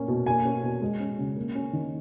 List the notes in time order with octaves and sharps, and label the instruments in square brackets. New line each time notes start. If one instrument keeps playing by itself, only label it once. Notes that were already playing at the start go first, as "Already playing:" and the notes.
Already playing: [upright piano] A#2 A#3 C#4
B2
A#3 G#5
C#4
B2
G#3
C#4
C#3
A#3
C#4
D#3